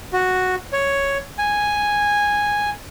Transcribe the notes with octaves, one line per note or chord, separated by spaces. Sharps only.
F#4
C#5
G#5